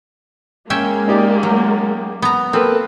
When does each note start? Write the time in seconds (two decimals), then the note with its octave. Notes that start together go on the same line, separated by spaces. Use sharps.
0.70 G#3 A#3 C#4 E5 G5
1.08 D#4 G4 D5
1.43 F#3
2.22 B3 A#5
2.53 A#3 C4 A4 B4